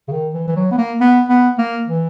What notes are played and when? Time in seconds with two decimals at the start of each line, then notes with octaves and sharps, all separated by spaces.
0.08 C#3
0.12 D#3
0.34 E3
0.48 E3
0.56 F#3
0.71 B3
0.78 A#3
1.00 B3
1.29 B3
1.58 A#3
1.87 E3